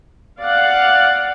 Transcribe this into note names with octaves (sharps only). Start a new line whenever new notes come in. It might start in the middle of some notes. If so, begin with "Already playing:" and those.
D5 F5 F#5